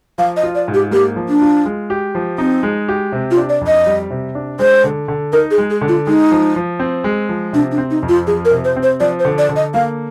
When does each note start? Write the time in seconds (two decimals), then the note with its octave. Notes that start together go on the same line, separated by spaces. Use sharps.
0.18 F3 F5
0.37 D#5
0.43 F4
0.55 D5
0.68 G#2
0.74 G4
0.91 A#3 G4
1.16 F3
1.29 D4
1.41 F4
1.65 G#3
1.90 G4
2.15 F3
2.38 C4 D#4
2.63 G#3
2.88 G4
3.12 C3
3.31 F4
3.37 D4
3.49 D5
3.61 F2
3.67 D#5
3.86 G3
4.10 C3
4.35 D4
4.59 G#3 C5
4.84 D3
5.08 D3
5.32 D#4 A#4
5.51 G#4
5.58 G#3
5.70 G#4
5.81 D3
5.88 F4
6.07 G#3 D#4
6.31 F3
6.56 F3
6.79 C4
7.04 G#3
7.29 F3
7.53 C3 D4
7.71 D4
7.78 C4
7.91 D#4
8.03 F2
8.09 F4
8.27 F3 G#4
8.45 A#4
8.51 C3
8.64 C5
8.76 C4
8.83 C5
9.00 F3 D5
9.19 C5
9.25 D3
9.38 D5
9.49 D3
9.56 D#5
9.74 A#3 F5